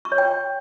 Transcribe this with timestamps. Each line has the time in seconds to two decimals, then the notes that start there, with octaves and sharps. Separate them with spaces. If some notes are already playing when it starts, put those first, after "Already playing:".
0.05 C#6
0.12 C#5
0.18 G5